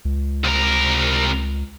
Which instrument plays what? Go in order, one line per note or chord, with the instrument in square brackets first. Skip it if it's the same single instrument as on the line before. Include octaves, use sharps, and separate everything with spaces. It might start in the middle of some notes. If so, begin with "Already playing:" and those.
[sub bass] C#2
[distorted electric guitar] C2 A#4